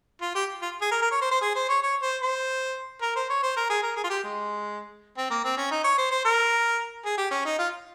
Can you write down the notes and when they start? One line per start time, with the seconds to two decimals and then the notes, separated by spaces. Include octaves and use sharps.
0.21 F4
0.35 G4
0.62 F4
0.81 G#4
0.91 A#4
1.02 A#4
1.11 C#5
1.21 C5
1.31 C5
1.42 G#4
1.55 C5
1.69 C#5
1.82 C#5
2.02 C5
2.22 C5
3.02 A#4
3.16 C5
3.30 C#5
3.42 C5
3.56 A#4
3.70 G#4
3.83 A#4
3.96 G#4
4.04 F4
4.09 G4
4.24 G#3
5.17 C4
5.30 A#3
5.44 C4
5.57 C#4
5.71 D#4
5.84 C#5
5.98 C5
6.11 C5
6.25 A#4
7.05 G#4
7.18 G4
7.31 C#4
7.45 D#4
7.59 F4